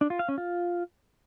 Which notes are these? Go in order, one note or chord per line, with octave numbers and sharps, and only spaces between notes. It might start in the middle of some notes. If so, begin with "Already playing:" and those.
D4
F4
F5
C#4
F4